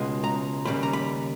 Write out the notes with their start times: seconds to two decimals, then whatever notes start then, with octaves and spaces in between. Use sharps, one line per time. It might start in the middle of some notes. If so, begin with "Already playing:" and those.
Already playing: C#2 B2 G#3
0.24 A#5
0.65 D#2 C#3 G3 B5
0.83 A#5
0.93 B5